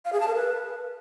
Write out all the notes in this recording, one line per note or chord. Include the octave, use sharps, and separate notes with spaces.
F5
G#4
A5
A#4
B4